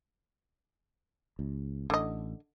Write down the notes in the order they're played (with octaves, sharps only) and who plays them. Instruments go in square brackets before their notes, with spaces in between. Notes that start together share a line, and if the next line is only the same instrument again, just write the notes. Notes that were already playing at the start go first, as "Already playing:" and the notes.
[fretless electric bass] C#2
[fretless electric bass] A1 [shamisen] D3 D#5